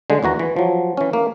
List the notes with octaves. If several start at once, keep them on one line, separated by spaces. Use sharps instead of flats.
D3 G#3
D#2 E3 F#4 A#5
E3
F3 F#3
E3 C#4
A#3